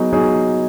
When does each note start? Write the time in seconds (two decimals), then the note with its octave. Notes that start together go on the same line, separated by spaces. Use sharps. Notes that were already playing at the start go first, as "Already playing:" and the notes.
Already playing: F#3 B3 D#4 G#4
0.13 F#3 B3 D#4 G#4